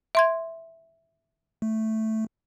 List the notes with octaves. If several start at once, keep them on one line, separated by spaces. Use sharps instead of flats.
E5 C6 G#6
A3